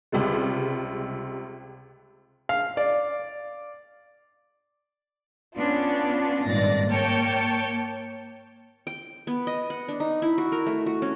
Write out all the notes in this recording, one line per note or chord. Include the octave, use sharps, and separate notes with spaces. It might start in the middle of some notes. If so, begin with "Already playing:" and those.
C#2 C3 G3 G#3
F5
D5
B3 C#4 D4 F4
G#1 G2 A#2 D5 A6 A#6
A#3 C#5 G5 A5 C#7
G5
B3
D#5
F#5
D4
D#4
E4
F#4
A#4
A3
F#4
C#4